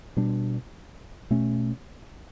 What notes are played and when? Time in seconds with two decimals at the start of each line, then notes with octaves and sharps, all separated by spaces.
0.17 B2 G3 D4
1.30 B2 A3 C#4